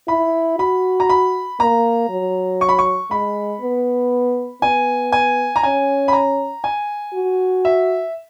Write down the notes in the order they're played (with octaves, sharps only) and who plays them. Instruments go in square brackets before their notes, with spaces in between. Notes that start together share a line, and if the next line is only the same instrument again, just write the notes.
[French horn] E4 [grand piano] B5
[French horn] F#4 [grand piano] B5
[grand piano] A#5
B5
[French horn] A#3 [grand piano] A#5
[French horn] F#3
[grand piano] C#6
B5
C#6
[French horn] G#3 [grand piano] B5
[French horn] B3
[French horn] B3 [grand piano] G#5
[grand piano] G#5
A#5
[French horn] C#4 [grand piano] G#5
[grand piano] B5
A#5
G#5
[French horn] F#4
[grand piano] E5